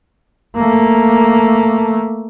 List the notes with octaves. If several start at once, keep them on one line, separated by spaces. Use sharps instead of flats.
A3 A#3